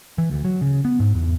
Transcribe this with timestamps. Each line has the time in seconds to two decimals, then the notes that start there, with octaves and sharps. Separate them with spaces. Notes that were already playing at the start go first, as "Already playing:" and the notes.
0.18 E3
0.31 D2
0.45 F#3
0.61 C#3
0.85 B3
1.00 G#2
1.15 E2